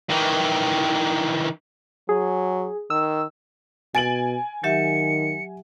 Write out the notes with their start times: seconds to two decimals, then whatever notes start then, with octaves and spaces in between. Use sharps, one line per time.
0.09 D#3 E3
2.09 F#3 G#4
2.90 D#3 E6
3.95 B2 G#5 A6 D7 F#7
4.64 D#3 F#3 G4 E5 C#7